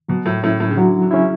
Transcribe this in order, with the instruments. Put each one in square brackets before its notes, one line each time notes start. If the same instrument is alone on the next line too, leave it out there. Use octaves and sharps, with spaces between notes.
[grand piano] B2 [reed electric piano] F#3
[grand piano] A2
[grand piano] A2 [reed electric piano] C#4 E4
[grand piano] A2
C#3
[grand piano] D3 [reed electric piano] F#3
[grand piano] D3
[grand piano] C#3 [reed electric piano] C#4 E4